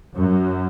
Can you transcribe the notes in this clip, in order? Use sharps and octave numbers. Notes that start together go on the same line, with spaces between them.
F#2